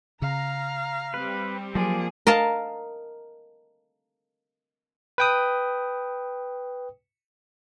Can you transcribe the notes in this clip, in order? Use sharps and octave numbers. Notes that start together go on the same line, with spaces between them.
C#3 F5 A#5
G3 C4 B4
F3 F#3 A#3 G#4 D5
A#4 D#5 F5 A5
B4 G5 D#6